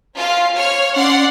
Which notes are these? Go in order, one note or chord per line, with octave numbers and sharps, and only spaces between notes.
C#4 F4 F5
C#5 F5 F6
C#4 D5 F#5 C6